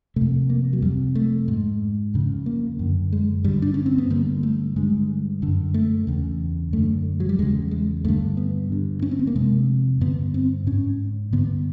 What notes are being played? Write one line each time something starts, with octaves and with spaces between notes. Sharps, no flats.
C3 A3
F2
A#3
F#3
F2 C3 G3
A3
G#2
F2 C#3
A#3
F#2 D3
G#3
G2 D3 G3
D4
C#4
C4
B3
G2 D3 A#3
A3
G2 D3 G#3
F#2 D3
A3
E2 C#3
F#2 D3 A3
F#3
G3
E2 C#3 G#3
G#3
G2 D3 A3
B3
G2 D3
C#4
C4
B3
A#3
F2 C3 G#3
G2 D3 B3
C4
G#2 C#4
G2 D3 B3